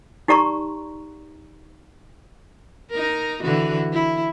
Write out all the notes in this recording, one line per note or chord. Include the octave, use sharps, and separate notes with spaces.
D#4 G4 D5 A#5 C6 C#6
D#4 A#4
D3 E3 F#4
E4